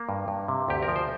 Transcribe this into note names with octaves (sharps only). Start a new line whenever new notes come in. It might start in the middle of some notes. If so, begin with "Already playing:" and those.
Already playing: A#3
G2
G2
C3
D2 G4
A#4
F3
C5